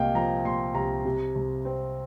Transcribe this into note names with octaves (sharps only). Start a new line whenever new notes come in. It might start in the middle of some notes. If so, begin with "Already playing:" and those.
Already playing: C2 A#2 A#3 D#5 F5 G5
F3 A#5
A#2 C6
C2 A#5
C3
C2
C4